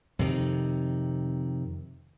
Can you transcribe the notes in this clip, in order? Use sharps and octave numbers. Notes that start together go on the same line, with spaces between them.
F2 C3 D#3